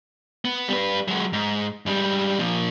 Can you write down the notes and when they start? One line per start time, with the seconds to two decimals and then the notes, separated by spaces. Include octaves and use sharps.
0.45 B3
0.68 G3 B4
1.08 F#3 G#3
1.33 G#2
1.86 G#2 G3
2.39 A#2 F3